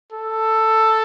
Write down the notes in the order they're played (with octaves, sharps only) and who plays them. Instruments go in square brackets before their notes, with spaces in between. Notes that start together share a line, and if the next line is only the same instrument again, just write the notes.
[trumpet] A4